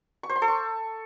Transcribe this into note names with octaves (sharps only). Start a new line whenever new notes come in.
C#6
C5
C6
A4
C#6